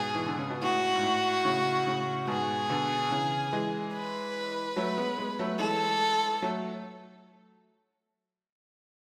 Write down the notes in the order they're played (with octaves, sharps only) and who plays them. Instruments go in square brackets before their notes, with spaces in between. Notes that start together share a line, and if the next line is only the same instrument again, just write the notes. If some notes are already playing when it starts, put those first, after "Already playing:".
Already playing: [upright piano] G#2 B2 [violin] G#4
[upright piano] E3
D3
C#3
B2
[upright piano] A2 [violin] F#4
[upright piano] G#2
A2
A2 C#3
A2 C#3
[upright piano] G#2 B2 [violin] G#4
[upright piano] B2 D3
C#3 E3
E3 G#3
[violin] B4
[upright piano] F#3 A3
G#3 B3
G#3 B3
F#3 A3
[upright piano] E3 G#3 [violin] A4
[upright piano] F#3 A3